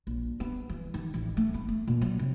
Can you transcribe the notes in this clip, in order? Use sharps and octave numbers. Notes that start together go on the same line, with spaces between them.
A#1
B3
E3
D#3
A1
A3
B3
A3
A#2
F#3
C3